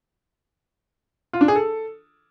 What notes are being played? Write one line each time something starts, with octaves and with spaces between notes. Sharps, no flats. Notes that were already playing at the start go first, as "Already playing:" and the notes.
F4
D4
G#4
A4